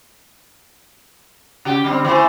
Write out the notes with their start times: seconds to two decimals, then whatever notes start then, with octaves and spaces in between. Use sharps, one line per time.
1.65 C#3 G4
1.84 D3 G3 C4
2.05 E3 A3 C5